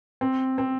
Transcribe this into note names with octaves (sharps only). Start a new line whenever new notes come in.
C4
C4